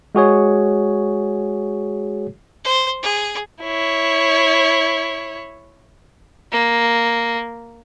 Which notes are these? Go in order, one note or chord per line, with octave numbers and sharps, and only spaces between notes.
G#3 F#4 G#4 C#5
C5
G#4
E4 C#5
A#3